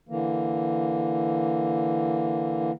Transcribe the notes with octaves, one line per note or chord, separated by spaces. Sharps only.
D3 E3 A#3